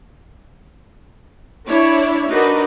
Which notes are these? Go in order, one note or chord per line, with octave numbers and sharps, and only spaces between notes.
D4 E4 C#5
D4 D#4 F#4 A#4 B4